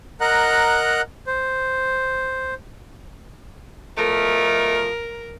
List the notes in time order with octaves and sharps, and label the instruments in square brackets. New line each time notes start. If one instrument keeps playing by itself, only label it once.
[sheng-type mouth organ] A#4 D#5 F#5 A#5 F#6
C5
[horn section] B2 F3 A3 [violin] A#4